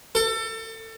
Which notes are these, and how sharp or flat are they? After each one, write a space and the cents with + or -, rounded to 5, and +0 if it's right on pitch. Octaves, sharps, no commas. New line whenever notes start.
A4 +30